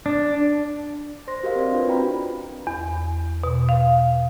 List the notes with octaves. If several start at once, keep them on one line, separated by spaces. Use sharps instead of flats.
D4
C5 C6 A#6
F#4 G4 A#4 C5 D#5 F5
C4 D5
D4 F4 F#4 B4
C4 E4 F#4 G5 A#5 B5
E2
B2
F5